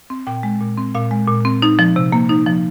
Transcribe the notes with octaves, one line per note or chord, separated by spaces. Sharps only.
C4
A#2 G5
G#3
A#2
C4
A#2 F5
G#3
A#2
C4
D#4
F3
C3
A#3
D#4
F3